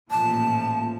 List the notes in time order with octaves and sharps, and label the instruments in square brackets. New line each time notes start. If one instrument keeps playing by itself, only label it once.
[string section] A1 A#2 F3 [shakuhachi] A5